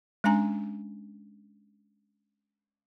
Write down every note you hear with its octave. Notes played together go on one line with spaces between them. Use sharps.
G#3 C#4 D4 G#5 A#5